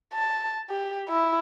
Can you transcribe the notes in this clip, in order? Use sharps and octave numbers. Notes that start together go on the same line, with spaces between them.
A5
G4
E4